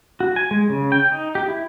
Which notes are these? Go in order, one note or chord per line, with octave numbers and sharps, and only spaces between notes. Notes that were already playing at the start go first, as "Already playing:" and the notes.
F#4
G#5
G#3
C#3
G5
D#4
G4
E4